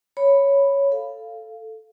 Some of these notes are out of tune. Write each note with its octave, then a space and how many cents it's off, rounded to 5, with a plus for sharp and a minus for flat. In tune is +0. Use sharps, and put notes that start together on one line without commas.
C#5 +0 B5 +0
A4 +0 F5 -10